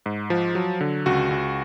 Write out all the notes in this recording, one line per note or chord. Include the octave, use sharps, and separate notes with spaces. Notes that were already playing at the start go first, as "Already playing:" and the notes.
G#2
F3
F#3
D3
C#2 F#4
C#2